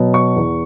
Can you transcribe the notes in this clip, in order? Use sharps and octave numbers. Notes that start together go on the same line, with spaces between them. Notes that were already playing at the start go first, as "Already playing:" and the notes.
Already playing: B2 F#3
C#6
E2